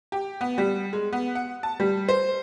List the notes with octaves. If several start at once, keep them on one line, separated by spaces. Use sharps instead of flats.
G4
B3
G3
G#3
B3
F#5
A5
G3
C5